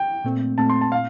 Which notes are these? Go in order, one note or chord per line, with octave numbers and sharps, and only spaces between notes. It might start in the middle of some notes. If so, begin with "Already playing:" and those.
Already playing: G5
A#2 A3 C4
A#2 A3 C4 A5
C6
A5
A#2 F5